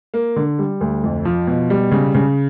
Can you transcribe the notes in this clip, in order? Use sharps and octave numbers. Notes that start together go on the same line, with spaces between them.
A#3
D3
G3
D2
F2
F3
B2
G3
C#3
C#3